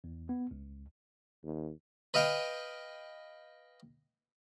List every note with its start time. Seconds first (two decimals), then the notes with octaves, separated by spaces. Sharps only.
0.04 E2
0.29 B3
0.51 C#2
1.44 D#2
2.14 B4 D#5 F5 G5